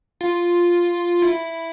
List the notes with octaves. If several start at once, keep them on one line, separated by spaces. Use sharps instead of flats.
F4
E4